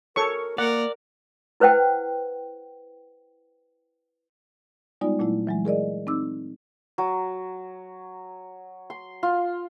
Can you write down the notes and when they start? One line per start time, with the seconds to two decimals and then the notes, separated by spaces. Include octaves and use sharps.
0.16 A4 A#4 C#5 C#6
0.58 A#3 A#4 D5 F#5
1.60 E4 B4 C5 F#5 G5
5.01 G3 G#3 B3 D#4 F4 D5
5.19 A#2 F#3 A3 E4
5.47 E3 F#3 G#3
5.65 G#4 A#4 D5 D#5
6.07 C4 D#4 D6 E6
6.98 F#3
8.90 C6
9.23 F4